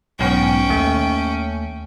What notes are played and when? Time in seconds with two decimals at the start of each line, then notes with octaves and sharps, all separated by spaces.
0.19 B1 G#2 B3 C#4 G5
0.70 D#2 A3